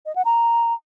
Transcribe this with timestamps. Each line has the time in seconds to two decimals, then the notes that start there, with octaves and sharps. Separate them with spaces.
0.06 D#5
0.15 F#5
0.25 A#5